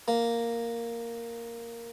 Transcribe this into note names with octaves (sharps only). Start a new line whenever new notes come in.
A#3